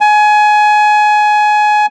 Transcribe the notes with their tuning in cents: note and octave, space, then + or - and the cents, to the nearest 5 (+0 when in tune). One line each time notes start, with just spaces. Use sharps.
G#5 +25